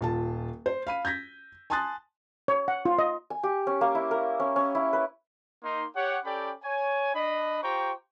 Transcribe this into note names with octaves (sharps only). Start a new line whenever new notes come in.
D#1 F4 A5
C5
F5 B5 D#7
G6 G#6 A#6 B6
G#5 A5 C6 D#6 F#6 A6
C#5
F#5
F4
D#5
G#5
G4
C#4
A#3
E4
A#4
C#4
C#4
E4
B4
A#3 D#4 C6
G4 C#5 F#5
C#4 G4 A4 D5 G5 B5
C#5 G#5
D4 D#5 B5
F4 G4 C5 G5 A#5 C#6